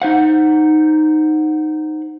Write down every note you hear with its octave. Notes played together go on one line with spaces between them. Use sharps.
D#4 C5 F#5